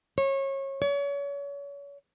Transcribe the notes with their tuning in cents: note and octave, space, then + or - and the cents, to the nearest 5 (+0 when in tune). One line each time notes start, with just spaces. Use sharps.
C#5 -30
C#5 +35